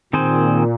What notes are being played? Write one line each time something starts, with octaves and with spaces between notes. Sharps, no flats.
A#2 D#3 C4 G#4 C5